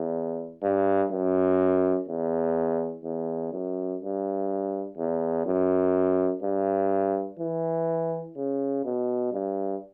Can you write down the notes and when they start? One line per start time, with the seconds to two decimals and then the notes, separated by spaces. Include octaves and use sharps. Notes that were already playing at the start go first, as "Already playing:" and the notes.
Already playing: E2
0.62 G2
1.11 F#2
2.08 E2
3.04 E2
3.52 F#2
4.01 G2
4.97 E2
5.46 F#2
6.43 G2
7.39 E3
8.36 C#3
8.84 B2
9.32 G2